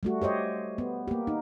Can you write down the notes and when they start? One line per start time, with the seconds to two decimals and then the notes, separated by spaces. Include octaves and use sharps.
0.03 G3 A3 F#4
0.22 G4 C5 C#5 D#5
0.78 B3
1.08 A#3 G4
1.27 D#4